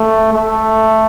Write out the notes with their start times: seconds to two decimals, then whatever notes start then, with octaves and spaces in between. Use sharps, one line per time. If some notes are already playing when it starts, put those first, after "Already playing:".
Already playing: A3
0.33 A3